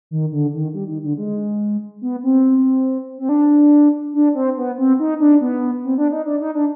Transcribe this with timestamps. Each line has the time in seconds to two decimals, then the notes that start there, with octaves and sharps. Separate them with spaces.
0.11 D#3
0.32 D3
0.53 D#3
0.74 G3
0.88 D#3
1.03 D3
1.18 G#3
2.01 B3
2.23 C4
3.18 C4
3.29 D4
4.14 D4
4.35 C4
4.57 B3
4.78 C4
4.99 D#4
5.20 D4
5.41 B3
5.84 C4
5.98 D4
6.12 D#4
6.26 D4
6.41 D#4
6.55 D4